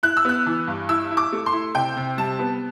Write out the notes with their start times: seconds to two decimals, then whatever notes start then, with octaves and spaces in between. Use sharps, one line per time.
0.03 E4 F#6
0.17 E6
0.25 B3 F#6
0.46 E3
0.67 G2
0.89 E4 E6
1.11 E4
1.17 D6
1.32 A3
1.46 C6
1.53 E4
1.75 C3 G5
1.96 C3
2.17 G3 A5
2.39 B3